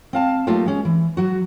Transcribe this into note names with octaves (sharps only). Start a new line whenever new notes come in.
C4 F5 A5
F#3 A3 A#3 D#4 F4 G4
G#3 C#4
E3
F#3 F#4